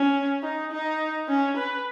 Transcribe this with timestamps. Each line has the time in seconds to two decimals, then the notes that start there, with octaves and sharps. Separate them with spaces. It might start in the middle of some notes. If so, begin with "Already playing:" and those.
Already playing: C#4
0.43 D#4
0.71 D#4
1.28 C#4
1.57 B4